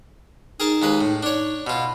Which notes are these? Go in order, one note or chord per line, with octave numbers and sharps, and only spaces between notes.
D#4 G#4 A#4 A5
D#2 G#3 B4
A2
D4 D#4 C#5
B2 F4 B5